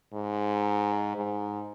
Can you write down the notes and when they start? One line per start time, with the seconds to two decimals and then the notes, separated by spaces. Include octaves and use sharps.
0.14 G#2
1.16 G#2